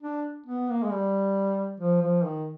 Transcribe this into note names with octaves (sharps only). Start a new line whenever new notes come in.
D4
B3
A#3
G#3
G3
F3
F3
D#3